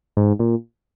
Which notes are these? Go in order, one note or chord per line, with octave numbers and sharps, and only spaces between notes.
G#2
A#2